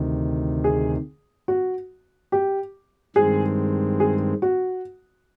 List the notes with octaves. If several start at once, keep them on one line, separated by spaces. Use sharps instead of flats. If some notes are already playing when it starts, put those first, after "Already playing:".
Already playing: D2 C3 D#3
G#4
F#4
G4
G2 D#3 G#3 C4 G#4
G#4
F#4